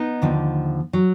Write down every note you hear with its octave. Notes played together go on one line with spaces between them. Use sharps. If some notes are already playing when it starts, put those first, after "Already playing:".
Already playing: B3 D#4
D#2 D3 F3
F#3